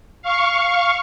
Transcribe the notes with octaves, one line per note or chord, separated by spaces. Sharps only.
F5 C#6